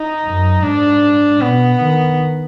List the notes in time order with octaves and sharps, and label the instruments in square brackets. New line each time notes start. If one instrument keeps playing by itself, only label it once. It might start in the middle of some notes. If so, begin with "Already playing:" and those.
Already playing: [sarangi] D#4
[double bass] F#2
[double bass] G#2 [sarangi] D4
[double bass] B2 [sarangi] B3
[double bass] D#3